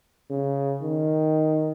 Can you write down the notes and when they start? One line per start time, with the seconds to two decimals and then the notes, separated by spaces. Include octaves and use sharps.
0.30 C#3
0.82 D#3